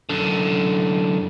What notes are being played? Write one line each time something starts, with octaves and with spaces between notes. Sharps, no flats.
F#2 D3